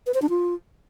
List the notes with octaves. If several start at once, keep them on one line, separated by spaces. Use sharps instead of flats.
B4
C5
D4
F4